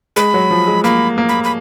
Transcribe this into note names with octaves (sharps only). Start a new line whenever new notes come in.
G#3 B5
F#3
F3
G#3
A#3 B5
A#3
B5
B5